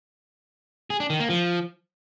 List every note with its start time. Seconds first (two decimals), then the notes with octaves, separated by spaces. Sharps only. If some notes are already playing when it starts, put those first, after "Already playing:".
0.90 G#4
1.00 D4
1.10 D#3
1.20 A#3
1.30 F3